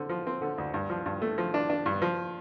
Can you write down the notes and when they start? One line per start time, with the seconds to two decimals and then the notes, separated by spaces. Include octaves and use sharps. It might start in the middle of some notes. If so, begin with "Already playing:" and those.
Already playing: D3 C4
0.09 F3
0.27 C4
0.42 D3
0.58 D2
0.74 G2
0.90 F3
1.06 G2
1.22 A3
1.38 F3
1.54 D4
1.70 D4
1.86 G2
2.02 F3